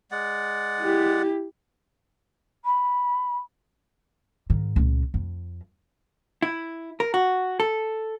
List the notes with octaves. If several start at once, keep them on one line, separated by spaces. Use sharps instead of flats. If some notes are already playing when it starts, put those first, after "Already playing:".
G#3 D5 F#5
E4 G4
B5
G#2 D#3
C#2 A#2
F2
E4
A#4
F#4
A4